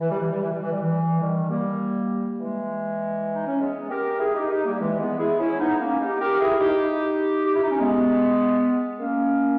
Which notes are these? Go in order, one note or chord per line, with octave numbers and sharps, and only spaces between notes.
E3
G3
E3
G3
E3
G3
E3
G3
E3
D#3 G3
G3 A#3
E3 G#3
D#4
C#4
G#3 B3
G4 A#4
E4 G#4
D#4 G4
D#4 G4
G3 A#3
E3 G#3
G#3 B3
E4 G#4
C#4 E4
B3 D#4
A#3 C#4
D#4 G4
G4 A#4
E4 G#4
D#4 G4
G4
E4
D#4
C#4
G#3 B3
A#3 C#4